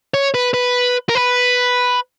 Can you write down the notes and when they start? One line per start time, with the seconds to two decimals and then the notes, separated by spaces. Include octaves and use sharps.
0.14 C#5
0.34 B4
0.54 B4
1.09 A#4
1.15 B4